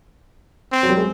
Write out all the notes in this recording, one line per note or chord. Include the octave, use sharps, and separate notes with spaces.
C4
F#3
G3
G#3